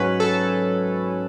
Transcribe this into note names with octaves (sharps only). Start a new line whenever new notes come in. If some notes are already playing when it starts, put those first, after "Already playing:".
Already playing: G#2 F#3 C#4 B4
A4